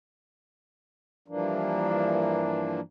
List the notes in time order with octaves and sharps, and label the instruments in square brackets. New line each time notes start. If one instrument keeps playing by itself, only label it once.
[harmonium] G2 E3 F3 A#3 D4